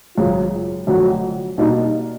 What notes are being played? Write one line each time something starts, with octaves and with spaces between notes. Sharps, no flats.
G#1 F#2 C#3 F4
F1 F2 D3 F#3 F#4
B2 G3 A#3 D4 D#4